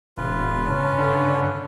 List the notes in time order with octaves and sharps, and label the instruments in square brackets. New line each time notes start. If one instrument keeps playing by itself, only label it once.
[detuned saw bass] E1 [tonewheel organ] A2 C3 [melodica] F4 B4
[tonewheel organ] G2 C#3 A5 [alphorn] C#4
[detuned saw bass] D3